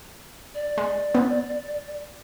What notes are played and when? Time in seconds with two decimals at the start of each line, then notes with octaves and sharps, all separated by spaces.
0.54 D5
0.78 G#3
1.14 B3 C4